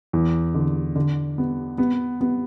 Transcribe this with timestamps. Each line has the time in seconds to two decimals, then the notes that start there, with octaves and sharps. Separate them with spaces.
0.13 E2
0.55 D3
0.96 D3
1.38 B3
1.78 B3
2.21 B3